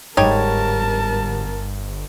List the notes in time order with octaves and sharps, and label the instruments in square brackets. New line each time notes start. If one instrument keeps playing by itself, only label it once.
[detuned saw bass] G1 [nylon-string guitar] G#2 G3 [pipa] D#4 G4 C#5 [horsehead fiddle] A#4 A5